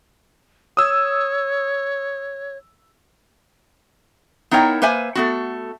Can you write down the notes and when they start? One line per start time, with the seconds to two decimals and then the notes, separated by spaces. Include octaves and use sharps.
0.77 C#5 D#6 E6
4.51 B3 D#4 E4 A#4 C#5 G5
4.82 A#3 B4 C5 E5 G#5
5.15 A3 B3 F#4